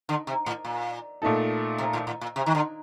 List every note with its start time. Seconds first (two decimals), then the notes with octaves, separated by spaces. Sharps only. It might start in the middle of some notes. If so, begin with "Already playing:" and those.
0.09 D3
0.27 C3
0.46 A2
0.65 A#2
1.22 A#2 A3 D#4 A4
1.78 C3
1.93 A2
2.07 A2
2.21 A#2
2.36 C3
2.46 D#3
2.55 D3